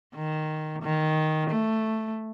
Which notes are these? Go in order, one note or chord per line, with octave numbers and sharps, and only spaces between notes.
D#3
D#3
A3